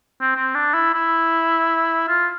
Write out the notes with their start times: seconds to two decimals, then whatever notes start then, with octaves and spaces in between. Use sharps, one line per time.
0.21 C4
0.36 C4
0.55 D4
0.74 E4
0.94 E4
2.08 F4